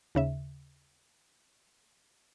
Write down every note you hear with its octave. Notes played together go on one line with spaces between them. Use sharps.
D#2 C#3 E5